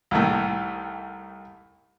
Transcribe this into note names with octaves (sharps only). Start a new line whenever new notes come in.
C2 D#3 A3